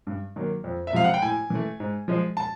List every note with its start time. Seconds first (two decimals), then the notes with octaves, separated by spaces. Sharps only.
0.07 G2
0.36 D#3 F#3 A#3
0.64 F2
0.87 E5
0.93 C3 F3 G#3 F5
1.04 F#5
1.14 G5
1.22 A2 G#5
1.50 E3 A3
1.80 G#2
2.08 F3 G#3
2.37 A5